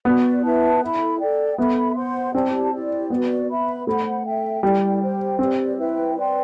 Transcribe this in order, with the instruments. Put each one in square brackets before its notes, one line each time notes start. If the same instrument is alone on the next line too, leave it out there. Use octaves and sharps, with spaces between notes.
[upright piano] B3 [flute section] F#4 B4 D5
[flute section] E4 B4 E5 A5
E4 A4 E5 B5
A4 D5 G5
[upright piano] B3 [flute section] A4 E5 B5
[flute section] C5 F#5 C6
[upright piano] C4 [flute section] E4 G4 D5 A5
[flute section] E4 G4 D5
[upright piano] B3 [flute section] F#4 B4 D5
[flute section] B4 E5 B5
[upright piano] A3 [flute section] C5 F#5 B5
[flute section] A4 E5 G5
[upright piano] G3 [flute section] E4 A4 D5 G5
[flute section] G4 C5 G5
[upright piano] C4 [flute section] G4 B4 D5
[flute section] E4 B4 E5 G5
B4 D5 G5 C6